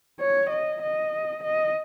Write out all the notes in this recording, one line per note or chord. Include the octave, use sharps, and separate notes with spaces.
C#5
D#5
D#5
D#5